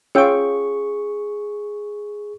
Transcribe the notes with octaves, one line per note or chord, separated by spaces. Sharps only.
C#4 F4 G#4 C#5 G5 C#6 E6